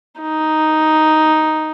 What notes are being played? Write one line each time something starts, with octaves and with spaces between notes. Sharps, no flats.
D#4